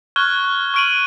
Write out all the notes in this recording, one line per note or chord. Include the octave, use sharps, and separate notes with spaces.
C#6 F6 F#6 G#6 G7
F#6
C#6 F6 D7 D#7 F#7